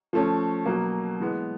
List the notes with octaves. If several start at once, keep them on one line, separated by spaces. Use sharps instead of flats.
F3 A3 C#4
B2 F#3 A#3
E3 G#3 B3